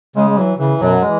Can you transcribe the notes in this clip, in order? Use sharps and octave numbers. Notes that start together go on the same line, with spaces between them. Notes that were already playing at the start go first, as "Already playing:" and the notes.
C#3 G#3
G#3
E3 F#3
C#3 E3
F#2 B2 F#3
E3 G#3